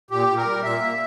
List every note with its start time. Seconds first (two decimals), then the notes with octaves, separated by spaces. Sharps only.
0.11 A#2 G4
0.28 A#2
0.37 A#4
0.46 G3
0.63 A#2 E5
0.80 A#3